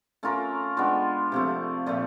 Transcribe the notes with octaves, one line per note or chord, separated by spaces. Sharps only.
A3 C#4 F4 A#4
G#3 B3 D4 F4
C3 F3 A3
A#2 F3 A3